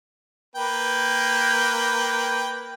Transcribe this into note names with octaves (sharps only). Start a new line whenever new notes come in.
A#3 B4 G5